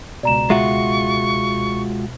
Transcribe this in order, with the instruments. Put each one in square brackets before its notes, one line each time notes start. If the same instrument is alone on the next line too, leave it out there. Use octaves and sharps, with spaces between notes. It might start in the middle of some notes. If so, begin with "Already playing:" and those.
[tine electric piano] C#2 B2 [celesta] D5 A#5 E7
[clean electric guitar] G#3 F4 F#4 [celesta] E5 [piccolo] C#6